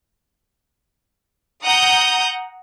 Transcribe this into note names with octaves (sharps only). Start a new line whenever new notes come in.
F#5 A#5 D#6 G6